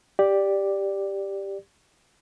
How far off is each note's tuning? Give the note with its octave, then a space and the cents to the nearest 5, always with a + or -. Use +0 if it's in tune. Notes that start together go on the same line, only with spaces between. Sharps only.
G4 +5 D5 +0